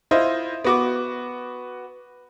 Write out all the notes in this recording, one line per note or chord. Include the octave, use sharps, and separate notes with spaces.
E4 F4 C5 D#5
B3 F#4 D6